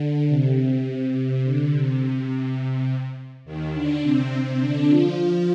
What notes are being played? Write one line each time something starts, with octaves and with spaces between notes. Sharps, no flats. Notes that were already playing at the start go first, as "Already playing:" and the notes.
Already playing: D3
C3
D3
C3
D#2 D#3
D3 D4
C3 C4
D3 D4
F3 F4